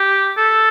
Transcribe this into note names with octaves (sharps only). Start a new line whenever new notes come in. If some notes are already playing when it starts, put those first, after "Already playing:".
Already playing: G4
A4